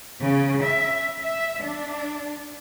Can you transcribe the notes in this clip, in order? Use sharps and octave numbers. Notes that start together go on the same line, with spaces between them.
C#3
E5
E5
D4